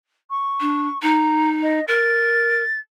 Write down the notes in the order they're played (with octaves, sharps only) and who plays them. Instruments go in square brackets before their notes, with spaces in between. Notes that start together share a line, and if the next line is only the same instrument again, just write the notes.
[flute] C#6
[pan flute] D4
[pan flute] D#4 [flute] A#5
[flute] D#5
[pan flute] A#4 [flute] A6